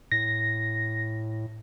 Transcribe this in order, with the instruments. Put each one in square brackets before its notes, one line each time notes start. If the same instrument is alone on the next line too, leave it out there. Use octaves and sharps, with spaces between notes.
[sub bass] A2 [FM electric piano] A#6